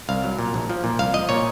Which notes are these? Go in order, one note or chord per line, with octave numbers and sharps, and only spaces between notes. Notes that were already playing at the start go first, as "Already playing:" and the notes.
C2 F5
F#3
A#2
A#1
F3
A#2
C2 F5
F3 D#5
A#2 C#5